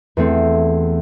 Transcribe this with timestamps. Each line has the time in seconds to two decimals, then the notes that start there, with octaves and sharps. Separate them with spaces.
0.17 E2 A3 C4